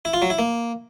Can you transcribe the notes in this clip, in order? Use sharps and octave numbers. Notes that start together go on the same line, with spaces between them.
E4
F4
F#3
E4
A#3